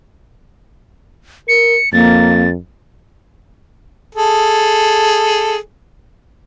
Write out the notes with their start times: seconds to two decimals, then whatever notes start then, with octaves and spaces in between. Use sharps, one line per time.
1.48 A#4 C#7
1.93 F2 A#3 A6
4.15 G#4 A4